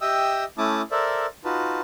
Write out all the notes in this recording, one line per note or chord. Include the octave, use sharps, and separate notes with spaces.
G4 D#5 E5 G5 D#6 E6
A3 C#4 E4 A5 D6 D#6
A4 A#4 C5 D5 E5
D#4 F4 F#4 B4 A5